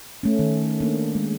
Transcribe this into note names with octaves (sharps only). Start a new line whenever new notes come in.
A3 C#4
D#3
A#3 D4
G#3